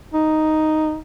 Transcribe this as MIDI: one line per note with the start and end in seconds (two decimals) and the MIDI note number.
0.14 0.98 63